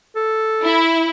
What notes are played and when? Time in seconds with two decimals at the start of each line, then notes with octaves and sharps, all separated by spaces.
0.16 A4
0.64 E4